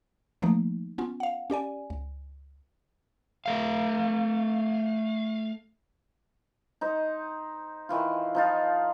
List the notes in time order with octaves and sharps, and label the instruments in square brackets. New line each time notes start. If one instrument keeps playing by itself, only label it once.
[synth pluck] D#3 F3 A3 A#3 D#4
B3 C#4 F4
F5 F#5
C#4 G4 D5 G#5
C#2
[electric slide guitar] A3 F5
[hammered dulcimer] D#4 C5
D#3 E3 F4
F3 D#4 F4